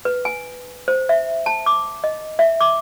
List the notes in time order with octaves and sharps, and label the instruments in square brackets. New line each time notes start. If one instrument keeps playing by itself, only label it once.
[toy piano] B4
G#5
C5
E5
A5
D6
D#5
E5
D6